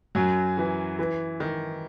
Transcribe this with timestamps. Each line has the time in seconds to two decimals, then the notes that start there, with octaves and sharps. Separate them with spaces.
0.15 F#2 F#3
0.58 E3
0.99 E3
1.40 D#3